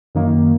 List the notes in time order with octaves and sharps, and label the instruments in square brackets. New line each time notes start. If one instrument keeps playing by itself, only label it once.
[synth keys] F#2 D#3 A#3